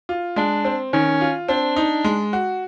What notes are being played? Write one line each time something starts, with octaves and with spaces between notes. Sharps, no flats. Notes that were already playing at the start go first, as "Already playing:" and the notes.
F4
G#3 D4
C4
D#3 C#4
F4
C4 D4
D#4
G#3
F#4